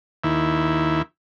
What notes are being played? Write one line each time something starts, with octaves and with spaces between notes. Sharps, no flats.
D#2 E4